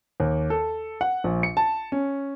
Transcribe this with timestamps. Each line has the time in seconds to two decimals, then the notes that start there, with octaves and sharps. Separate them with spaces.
0.20 D#2
0.50 A4
1.01 F#5
1.24 A#1
1.43 C#7
1.57 A5
1.92 C#4